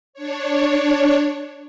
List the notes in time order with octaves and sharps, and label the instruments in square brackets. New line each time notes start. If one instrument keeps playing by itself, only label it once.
[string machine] D4 C#5